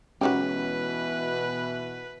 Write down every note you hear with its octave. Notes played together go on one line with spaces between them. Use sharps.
B2 E3 F#3 G#3 C#4 D#4 G4 B4